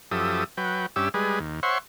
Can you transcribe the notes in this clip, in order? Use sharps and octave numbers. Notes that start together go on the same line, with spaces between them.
F#2 F3 G4 A4 E5 D#6
F#3 B4 G5
G2 C#4 G4 E5 D6 E6
G3 G#3 G#4 B4
D#2
C5 C#5 E5 F#5 C6 C#6